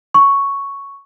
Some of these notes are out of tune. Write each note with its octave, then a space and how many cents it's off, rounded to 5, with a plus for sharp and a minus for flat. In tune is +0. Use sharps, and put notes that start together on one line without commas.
C#6 +0